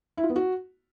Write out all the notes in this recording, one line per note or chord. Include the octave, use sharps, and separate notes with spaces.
E4
F4
B3
F#4